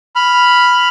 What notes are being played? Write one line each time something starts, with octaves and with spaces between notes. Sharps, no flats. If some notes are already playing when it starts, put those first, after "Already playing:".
B5 F6